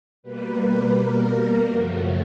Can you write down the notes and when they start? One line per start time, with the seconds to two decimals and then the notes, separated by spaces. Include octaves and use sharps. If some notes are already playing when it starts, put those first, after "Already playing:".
0.23 B2 G3 A#3 B4
0.58 B4
0.95 A#4
1.66 F#2 C#3 F3 A3 F#4